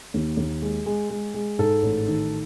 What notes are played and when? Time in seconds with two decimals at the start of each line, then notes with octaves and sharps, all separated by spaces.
0.14 D#2
0.37 D#2
0.62 G#3
0.86 G#3
1.10 G#3
1.34 G#3
1.59 G#2 A4
1.83 A1
2.07 D#3